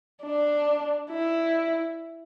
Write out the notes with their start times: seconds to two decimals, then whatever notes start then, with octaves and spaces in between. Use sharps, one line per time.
0.24 D4
1.11 E4